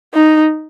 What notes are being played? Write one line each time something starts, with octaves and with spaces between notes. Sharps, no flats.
D#4